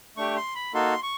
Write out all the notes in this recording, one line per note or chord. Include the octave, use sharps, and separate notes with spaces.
A3 D4 G4 C#6
C6
B5
A#3 D#4 F#4 A4 C6
C#6